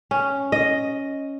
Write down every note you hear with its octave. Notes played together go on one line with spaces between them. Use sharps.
C#4
D#5